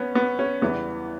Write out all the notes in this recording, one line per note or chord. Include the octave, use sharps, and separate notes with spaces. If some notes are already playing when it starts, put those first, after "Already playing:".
Already playing: B3 C#4
B3
C#4
E2 C#3 E3 G3 B3